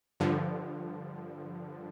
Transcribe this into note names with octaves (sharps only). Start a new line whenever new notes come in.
G2 D3 F3